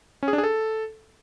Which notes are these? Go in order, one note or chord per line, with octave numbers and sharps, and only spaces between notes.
C#4
G#4
D4
G#4
A4